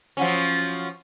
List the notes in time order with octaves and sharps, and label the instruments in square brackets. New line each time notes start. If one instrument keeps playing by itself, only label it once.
[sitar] F3 F#3 C#4